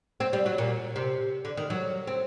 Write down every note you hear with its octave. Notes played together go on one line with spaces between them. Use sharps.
C4
G3
F#3
A#2
C3
D3
D#3
F#3
C4